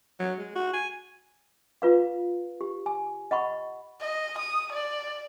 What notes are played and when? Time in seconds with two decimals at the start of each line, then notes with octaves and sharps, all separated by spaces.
0.20 F#3
0.39 G#3
0.56 F#4
0.73 G#5
1.82 F4 B4 F5
2.61 G4
2.86 G#5
3.31 D#5 F#5 B5 C#6
4.01 D#5
4.38 D#6
4.73 D5